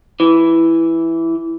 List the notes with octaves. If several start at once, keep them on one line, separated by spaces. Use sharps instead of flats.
E3